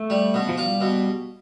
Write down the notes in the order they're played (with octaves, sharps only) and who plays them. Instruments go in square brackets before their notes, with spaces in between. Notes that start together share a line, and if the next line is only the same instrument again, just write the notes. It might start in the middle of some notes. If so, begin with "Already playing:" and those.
Already playing: [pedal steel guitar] A3
[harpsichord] G3
B2
[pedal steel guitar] F3
[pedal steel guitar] G3 [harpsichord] F4
[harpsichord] B2